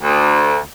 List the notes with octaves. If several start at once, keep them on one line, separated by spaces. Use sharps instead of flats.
D2